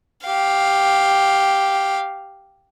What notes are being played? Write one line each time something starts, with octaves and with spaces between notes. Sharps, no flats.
G4 F5